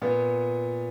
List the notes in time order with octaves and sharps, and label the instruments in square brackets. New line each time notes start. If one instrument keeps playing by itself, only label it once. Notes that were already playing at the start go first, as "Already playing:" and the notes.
[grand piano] A#2 B3